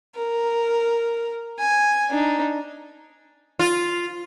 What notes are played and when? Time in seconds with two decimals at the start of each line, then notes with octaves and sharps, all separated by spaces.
0.16 A#4
1.59 G#5
2.10 D4 D#4
3.59 F4